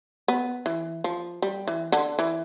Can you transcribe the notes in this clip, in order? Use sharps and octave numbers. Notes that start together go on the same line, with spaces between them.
B3
E3
F3
G3
E3
D3
E3